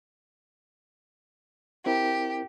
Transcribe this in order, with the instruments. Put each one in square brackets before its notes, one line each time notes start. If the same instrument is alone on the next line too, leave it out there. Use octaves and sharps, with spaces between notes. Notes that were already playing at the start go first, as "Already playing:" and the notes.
[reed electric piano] C4 E4 A#4 [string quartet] G4